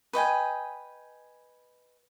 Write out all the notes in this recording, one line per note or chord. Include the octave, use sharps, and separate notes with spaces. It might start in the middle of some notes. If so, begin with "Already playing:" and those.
B4 D#5 G5 G#5